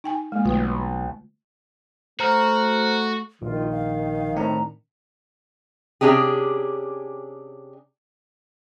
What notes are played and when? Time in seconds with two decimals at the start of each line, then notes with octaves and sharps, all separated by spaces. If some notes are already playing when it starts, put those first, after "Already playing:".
0.04 D#4 G5 G#5
0.32 G#3 A#3
0.45 B1 D3 A3 F4
2.20 A3 F#4 C5 A#5 F6
3.42 A#1 D#3 F4
3.71 F5
4.36 A2 C4 D4 A#5
6.01 C3 C#4 D4 G4 G#4